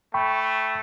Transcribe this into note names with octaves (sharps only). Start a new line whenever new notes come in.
A3 G5 B5 C#6